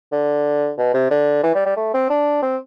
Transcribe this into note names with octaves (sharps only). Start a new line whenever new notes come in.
D3
B2
C3
D3
E3
G3
G3
A3
C4
D4
C4